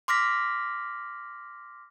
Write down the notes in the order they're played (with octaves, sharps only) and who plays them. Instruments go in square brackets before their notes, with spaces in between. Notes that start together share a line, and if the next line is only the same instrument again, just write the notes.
[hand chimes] C6 D6 F6 A#6 B6